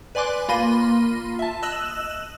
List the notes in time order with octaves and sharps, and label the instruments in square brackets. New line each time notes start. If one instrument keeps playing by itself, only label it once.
[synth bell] B4 D5 G#5 C6 D6 F#6
A#3 F4 B5 C6 A#6 D#7
E5 A5
D#5 E6 F#6 E7 F#7